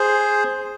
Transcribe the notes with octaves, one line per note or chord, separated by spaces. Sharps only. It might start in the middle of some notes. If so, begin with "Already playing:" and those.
Already playing: G#4 C5